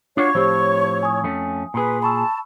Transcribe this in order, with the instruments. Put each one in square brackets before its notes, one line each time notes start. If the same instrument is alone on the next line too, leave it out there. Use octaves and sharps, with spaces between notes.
[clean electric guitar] D4 F4 F#4 [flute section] C#5 C#6
[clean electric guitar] A2 F3 C4 [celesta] G4 C5
[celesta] G#5 D#6
[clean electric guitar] F2 A3 C#4
[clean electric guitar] A#2 G#4 [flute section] B4
[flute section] A5 [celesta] B5 C#6 E6